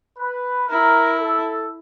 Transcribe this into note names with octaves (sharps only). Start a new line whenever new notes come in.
B4
E4 A#4
A4